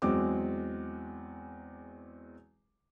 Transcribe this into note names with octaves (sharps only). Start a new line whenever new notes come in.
E2 F#3 G#3 C4 D6